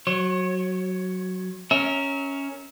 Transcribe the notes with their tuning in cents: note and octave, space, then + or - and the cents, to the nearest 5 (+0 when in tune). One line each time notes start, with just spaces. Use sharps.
F#3 +0 C#5 -40
C#4 +0 A#4 -5 E5 -30